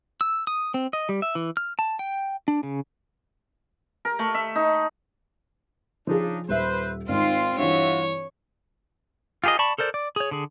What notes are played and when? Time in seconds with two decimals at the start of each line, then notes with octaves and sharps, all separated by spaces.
0.21 E6
0.47 D#6
0.74 C4
0.93 D#5
1.09 G3
1.22 E5
1.35 E3
1.57 F6
1.79 A5
1.99 G5
2.48 D4
2.63 C#3
4.05 A#4
4.19 A3
4.34 E5
4.55 D#4
6.07 C#3 F3 D4 D#4 G#4
6.49 D#1 B4 C5 E5
7.08 G#1 C4 D#4 F4 F5
7.58 G2 E3 F4 F#4 C#5 E5
9.44 F4 G4 G#4 A#4 D#5
9.59 D5 A5 B5 C#6
9.78 A4 A#4 C5 D5
9.94 D5
10.16 G#4 C#5
10.31 D3 G#4